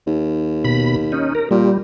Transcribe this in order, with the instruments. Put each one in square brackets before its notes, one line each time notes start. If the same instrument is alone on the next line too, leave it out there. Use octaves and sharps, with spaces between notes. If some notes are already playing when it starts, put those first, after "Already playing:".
[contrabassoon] D#2
[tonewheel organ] B2 B5
C#4 D#4
A#4
[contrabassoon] A#2 [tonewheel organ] G3